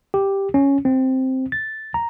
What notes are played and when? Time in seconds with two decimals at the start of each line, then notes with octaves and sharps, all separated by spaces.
0.14 G4
0.54 C#4
0.85 C4
1.52 A6
1.94 A#5